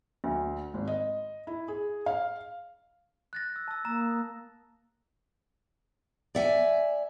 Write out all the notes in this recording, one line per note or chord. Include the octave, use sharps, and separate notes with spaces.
D2
G#1
D#5
E4
G#4
F5
F#6 A6 A#6
E6
A5 E6
A#3 A#5 E6
A#5 D#6
D5 E5 F#5 G#5